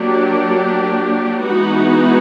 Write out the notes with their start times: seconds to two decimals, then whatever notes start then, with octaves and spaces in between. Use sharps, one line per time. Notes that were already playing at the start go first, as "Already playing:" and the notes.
Already playing: F#3 A#3 D4 G4
1.44 E3 G#3 B3 D#4 F#4